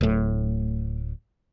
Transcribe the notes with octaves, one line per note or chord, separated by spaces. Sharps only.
D1 A2